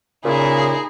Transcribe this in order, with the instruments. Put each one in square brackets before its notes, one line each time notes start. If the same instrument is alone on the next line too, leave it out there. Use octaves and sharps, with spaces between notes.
[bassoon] A#2 [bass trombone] C#3 [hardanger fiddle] D#4 E4 [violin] G#4